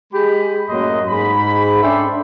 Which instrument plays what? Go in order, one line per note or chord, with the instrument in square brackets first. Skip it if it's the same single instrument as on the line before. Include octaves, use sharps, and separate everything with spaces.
[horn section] G#3 G4 B5
F#2 A2 F#3 A#3 D#5 C6
G#2 B5
C#4 D4 A4 E5 G5 C6